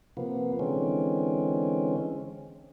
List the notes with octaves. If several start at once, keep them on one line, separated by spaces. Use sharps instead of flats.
C3 F3 A#3 B3
D3 E3 G#3 C4 C#4